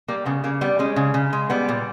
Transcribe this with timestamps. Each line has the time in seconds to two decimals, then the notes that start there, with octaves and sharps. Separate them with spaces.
0.08 G3 A#3
0.25 C#3 B3
0.44 C#3 A#3
0.61 G3 B3
0.79 G#3 C#4
0.96 C#3
1.14 C#3
1.33 G#3
1.50 G3 B3
1.68 A#2